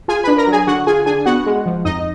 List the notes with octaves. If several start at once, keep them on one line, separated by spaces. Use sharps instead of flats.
F4 G#4 G#5
D4 B4 B5
A#4 A#5
F#3
G#4 G#5
D3 F#4 F#5
F4 G#4 G#5
D4 G#4 G#5
B3 F#4 F#5
G#3
F3
F2 D#4 D#5